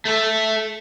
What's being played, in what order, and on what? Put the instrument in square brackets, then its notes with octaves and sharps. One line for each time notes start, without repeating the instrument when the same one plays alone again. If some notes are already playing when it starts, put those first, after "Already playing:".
[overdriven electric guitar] A3 A4